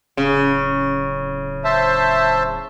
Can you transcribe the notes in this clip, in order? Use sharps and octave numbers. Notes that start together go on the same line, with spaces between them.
D1 C#3
C5 E5 A5